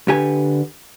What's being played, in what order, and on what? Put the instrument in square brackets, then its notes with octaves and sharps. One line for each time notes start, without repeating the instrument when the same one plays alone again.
[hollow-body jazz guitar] D3 G4 B4 G#5